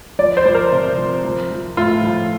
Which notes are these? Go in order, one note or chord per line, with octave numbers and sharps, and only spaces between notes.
F3 D5
C5
F3
A#4
C3
F3
F3
F3
A2 F4
F3